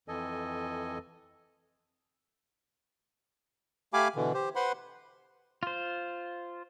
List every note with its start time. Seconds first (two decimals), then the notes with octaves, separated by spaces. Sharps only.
0.08 F2 E3 A4 D#5 G#5
3.93 A3 G4 F5 G#5 B5 D6
4.16 B2 D3 E3
4.34 G4 C5
4.56 B4 C5 F#5 B5 C6
5.63 F4 C5